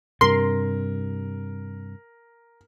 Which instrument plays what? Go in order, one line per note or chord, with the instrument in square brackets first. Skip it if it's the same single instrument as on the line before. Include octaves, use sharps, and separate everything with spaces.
[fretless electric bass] G2 C3 [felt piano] A#4 [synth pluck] C6